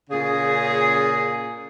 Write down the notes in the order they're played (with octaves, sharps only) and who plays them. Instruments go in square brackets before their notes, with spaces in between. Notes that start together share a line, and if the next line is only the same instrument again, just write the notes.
[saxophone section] A#2 C#3 G#4